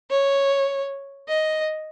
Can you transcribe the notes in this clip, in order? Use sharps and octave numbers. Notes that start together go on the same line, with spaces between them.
C#5
D#5